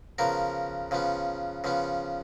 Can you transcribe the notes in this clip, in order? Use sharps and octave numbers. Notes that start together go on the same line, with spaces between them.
C#3 F3 B3 A#4
C#3 F3 B3
C#3 F3 B3